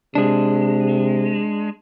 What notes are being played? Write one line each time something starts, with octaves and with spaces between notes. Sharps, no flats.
C3 G#3 D4